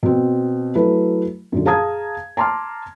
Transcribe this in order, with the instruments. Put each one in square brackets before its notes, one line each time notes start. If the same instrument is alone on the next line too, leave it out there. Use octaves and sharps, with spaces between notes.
[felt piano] B2 C4
F#3 A3 E4 B4
F#2 A#2 D3
G#4 F5 A5 A#5 D#6 G#6
A5 A#5 C6 D6 F6